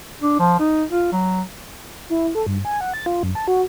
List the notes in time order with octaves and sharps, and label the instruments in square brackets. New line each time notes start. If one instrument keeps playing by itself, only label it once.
[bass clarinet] D4
F3
D#4
F4
F#3
[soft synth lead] E4
A4
G2
G#5
F#5
A6
F4
F#2
A5
F#4